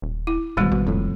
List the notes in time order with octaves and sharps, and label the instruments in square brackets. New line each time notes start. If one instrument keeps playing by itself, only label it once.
[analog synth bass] D#1
[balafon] E4
[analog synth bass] D1 [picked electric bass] A1 B2 [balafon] D#3 G3 G#3
[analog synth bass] A1 [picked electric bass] B2
[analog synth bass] E1 [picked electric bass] F2 A2